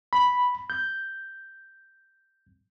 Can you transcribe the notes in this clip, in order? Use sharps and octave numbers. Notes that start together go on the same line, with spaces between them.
B5
G6